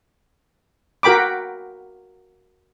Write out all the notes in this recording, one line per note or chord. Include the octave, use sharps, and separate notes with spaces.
F#4 A#4 G5 B5 D6